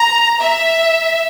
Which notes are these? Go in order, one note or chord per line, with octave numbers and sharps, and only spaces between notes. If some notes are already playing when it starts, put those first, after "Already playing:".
Already playing: A#5
E5